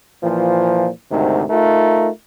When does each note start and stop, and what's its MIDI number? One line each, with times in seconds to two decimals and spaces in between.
0.23 0.89 46
0.23 0.89 52
0.23 0.89 53
1.10 1.44 38
1.10 1.44 44
1.10 1.44 48
1.10 1.44 51
1.49 2.08 57
1.49 2.08 63
1.49 2.08 65
1.49 2.08 70